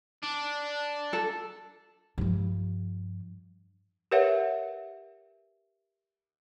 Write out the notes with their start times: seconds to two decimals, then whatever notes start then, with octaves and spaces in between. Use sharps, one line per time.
0.24 D4
1.13 A4
2.18 G2 F3
4.12 G4 A#4 B4 C#5 E5 F#5